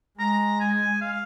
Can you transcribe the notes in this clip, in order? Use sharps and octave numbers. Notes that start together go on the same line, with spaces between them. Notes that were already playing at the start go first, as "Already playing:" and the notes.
G#3 A#5
G#5
F5